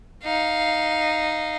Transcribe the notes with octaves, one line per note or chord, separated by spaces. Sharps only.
D#4 F5